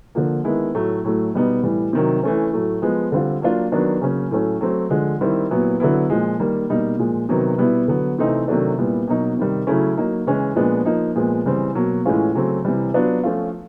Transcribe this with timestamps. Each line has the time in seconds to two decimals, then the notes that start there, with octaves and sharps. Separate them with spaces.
0.15 D3 F3 A#3
0.44 D#3 G#3 B3 E4
0.75 A2 F#3 A3
1.04 A2 F#3 A3
1.34 B2 G3 B3 D#4
1.63 A2 E3 G3
1.93 C3 D#3 F#3
2.23 E3 A3 C#4
2.53 A2 F#3 A3
2.82 F3 G#3 B3
3.12 D3 G3 C4 F4
3.42 F#3 A#3 D4 F4
3.72 D#3 F#3 B3 D4
4.01 C#3 F#3 A#3 C#4
4.31 A2 F#3 A3 C#4
4.61 F#3 A3 C4
4.90 D3 F3 G#3
5.21 D#3 G3 C4 E4
5.51 A#2 F#3 B3 E4
5.80 D3 F#3 B3 E4
6.10 A#2 F3 G#3
6.39 D#3 G3 A#3
6.69 B2 G3 A#3 D#4
6.99 A#2 F3 G#3
7.29 C3 D#3 F#3 B3
7.58 B2 G3 B3 E4
7.88 D3 F#3 B3
8.18 C3 E3 A3 C4 D#4
8.48 C3 D#3 F#3 A3 D4
8.78 A#2 G3 B3 E4
9.07 B2 F#3 A#3 D#4
9.37 C3 D#3 G3
9.67 C#3 F#3 A3 C#4 E4
9.97 F#3 A#3 D#4
10.27 C#3 E3 G#3 C#4 E4
10.56 A#2 F3 G#3 B3 D4
10.85 F3 A#3 D#4
11.15 A#2 F3 G#3 B3
11.45 C#3 E3 G3 C4
11.75 B2 F#3 A#3
12.05 A2 E3 G#3 C#4 F4
12.35 C#3 F#3 A3 C4
12.65 C3 E3 G3
12.94 F#3 B3 D4 F4
13.23 F3 A3 C#4 F4